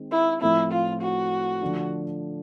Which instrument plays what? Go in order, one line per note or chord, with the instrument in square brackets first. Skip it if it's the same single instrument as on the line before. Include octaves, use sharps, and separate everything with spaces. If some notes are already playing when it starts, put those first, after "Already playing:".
Already playing: [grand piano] D#3 G#3 C4
[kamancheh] E4
[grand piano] A2 F3 A3 C4 [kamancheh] E4
[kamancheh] F4
F#4
[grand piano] D3 F3 A3 D4